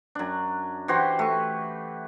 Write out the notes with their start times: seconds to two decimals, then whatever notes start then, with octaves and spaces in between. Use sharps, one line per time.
0.15 F#2 D4
0.88 E3 F#4 G4 C5
1.19 A3 C#6